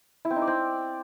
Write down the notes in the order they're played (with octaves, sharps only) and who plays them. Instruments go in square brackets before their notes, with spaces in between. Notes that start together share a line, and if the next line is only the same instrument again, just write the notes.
[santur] E4
C4
D#4
D5
C4